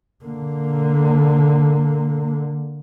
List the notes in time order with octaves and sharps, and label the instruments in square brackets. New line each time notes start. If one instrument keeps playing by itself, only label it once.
[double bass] D3 A#3